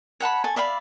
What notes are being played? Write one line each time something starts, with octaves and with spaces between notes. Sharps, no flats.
C#5 F#5 A5 B5
A4 G#5 C#6
D5 E5 F5 B5